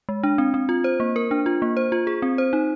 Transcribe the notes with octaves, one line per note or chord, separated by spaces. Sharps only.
G#3
D4
C4
C4
F4
C5
A#3
A#4
D4
F4
A#3
C5
F4
G#4
C4
C5
D#4